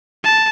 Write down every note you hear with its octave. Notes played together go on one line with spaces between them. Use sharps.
A5